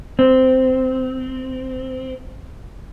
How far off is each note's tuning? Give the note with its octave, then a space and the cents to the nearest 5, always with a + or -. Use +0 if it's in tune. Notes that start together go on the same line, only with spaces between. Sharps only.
C4 -15